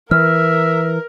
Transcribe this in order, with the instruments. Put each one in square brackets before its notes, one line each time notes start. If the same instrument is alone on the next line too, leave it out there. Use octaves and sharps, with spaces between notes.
[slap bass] E3 [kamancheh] A#4 [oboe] E5 [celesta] F6